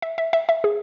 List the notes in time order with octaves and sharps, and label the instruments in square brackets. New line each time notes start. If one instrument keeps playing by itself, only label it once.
[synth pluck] E5
E5
E5
E5
G#4